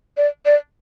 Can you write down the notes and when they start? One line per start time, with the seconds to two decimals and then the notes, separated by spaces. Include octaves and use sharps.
0.17 D5
0.46 D5